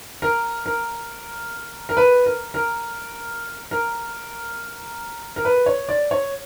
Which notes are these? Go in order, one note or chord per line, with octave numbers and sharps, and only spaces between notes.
A#4
A#4
A#4
B4
A#4
A#4
A#4
A#4
B4
C#5
D5
C#5